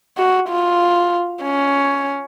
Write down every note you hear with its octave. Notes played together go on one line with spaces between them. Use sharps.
F#4
F4
C#4